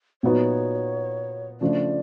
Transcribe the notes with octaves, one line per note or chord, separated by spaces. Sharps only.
A#2 F#3 B3 D#4 F#4 C#5
C#3 F3 A3 D4 D5